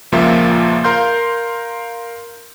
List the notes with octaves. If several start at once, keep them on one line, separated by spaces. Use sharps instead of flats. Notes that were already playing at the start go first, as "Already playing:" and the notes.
C#2 A#2 F3 A#3 F4 E5
A#4 F5 C6 G6